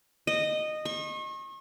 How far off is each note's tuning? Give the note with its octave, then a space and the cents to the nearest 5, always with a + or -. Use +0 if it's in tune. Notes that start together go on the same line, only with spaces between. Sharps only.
D#5 -15
C#6 -40